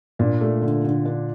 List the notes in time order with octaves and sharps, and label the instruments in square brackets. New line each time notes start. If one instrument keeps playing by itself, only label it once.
[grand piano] A#2 [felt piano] D4
[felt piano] A3
D3
D3
D4